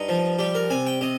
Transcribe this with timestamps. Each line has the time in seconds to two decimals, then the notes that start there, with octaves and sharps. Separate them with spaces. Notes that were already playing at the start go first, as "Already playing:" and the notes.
Already playing: G2 D#4
0.09 F3
0.39 G3 G4
0.55 A#4
0.70 C3 G#5
0.87 G5
1.01 C3 D#5